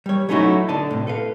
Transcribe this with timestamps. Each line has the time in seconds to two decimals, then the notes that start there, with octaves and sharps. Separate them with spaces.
0.06 G3 C#5
0.29 F#3 A3 C#4 D#4 E4 F#4
0.69 D3 D#5 A5
0.91 A2 C3
1.07 A4 B4 F5